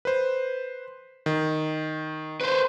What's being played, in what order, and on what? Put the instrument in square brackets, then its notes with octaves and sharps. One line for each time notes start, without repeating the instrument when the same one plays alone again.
[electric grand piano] B4 C5
D#3
[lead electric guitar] B4 C5